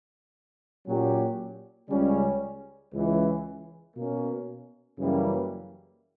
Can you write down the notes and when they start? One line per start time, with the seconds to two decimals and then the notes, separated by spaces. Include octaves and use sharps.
0.87 A#2 F#3 C#4 G4
1.89 C#2 C#3 G3 C#4
2.92 C#2 C#3 E3
3.94 B2 A#3 C#4
4.98 F#2 C#3 E3 G3 A#3